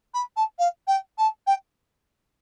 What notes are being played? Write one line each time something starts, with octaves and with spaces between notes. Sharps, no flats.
B5
A5
F5
G5
A5
G5